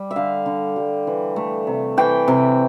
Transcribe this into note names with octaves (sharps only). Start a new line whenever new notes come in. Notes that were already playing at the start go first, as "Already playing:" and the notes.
Already playing: G3
E5
D3 F5
D3
G3
E3
A3
C3
E3 G5
C3